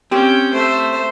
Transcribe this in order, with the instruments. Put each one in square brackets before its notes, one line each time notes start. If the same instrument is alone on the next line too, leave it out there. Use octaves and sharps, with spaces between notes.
[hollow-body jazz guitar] C4 G4 [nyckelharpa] C#4 G5
[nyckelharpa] A3 E5 [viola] C5